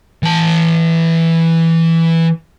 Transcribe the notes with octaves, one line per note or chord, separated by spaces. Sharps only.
E3 A5